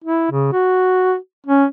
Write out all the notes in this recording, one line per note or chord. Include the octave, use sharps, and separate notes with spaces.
E4
C#3
F#4
C#4